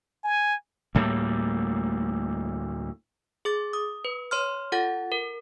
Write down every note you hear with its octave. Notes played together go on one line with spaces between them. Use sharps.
G#5
D2 A2 G3 A#3
G#4 D6 A6
D#6
B4
C#5 C6 F6
F4 A4 F#5 A6
A#4